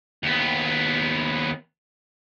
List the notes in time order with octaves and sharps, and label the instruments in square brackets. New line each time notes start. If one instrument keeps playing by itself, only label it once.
[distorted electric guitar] D#2 B3